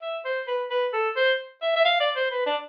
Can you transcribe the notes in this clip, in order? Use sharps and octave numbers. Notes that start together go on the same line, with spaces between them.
E5
C5
B4
B4
A4
C5
E5
E5
F5
D5
C5
B4
D4